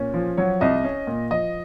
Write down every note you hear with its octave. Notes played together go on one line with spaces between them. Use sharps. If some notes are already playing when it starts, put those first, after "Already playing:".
Already playing: A#2 C#4
F3
F#3 C#5
C2 D#5
C#4
A#2
F3 D#5